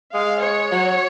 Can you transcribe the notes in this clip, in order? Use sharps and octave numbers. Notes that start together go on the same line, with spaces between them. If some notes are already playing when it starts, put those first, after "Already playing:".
G#3 F5
C#5
F#3